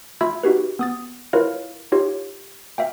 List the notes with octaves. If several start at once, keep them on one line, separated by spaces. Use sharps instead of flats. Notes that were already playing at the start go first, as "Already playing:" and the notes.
F4 E5 B5 E6 G#6
D#4 F#4 G4 B4
B3 D#6 A6
E4 F4 A#4 B4 C#5 F5
D#4 F4 G4 C#5
E5 F5 G5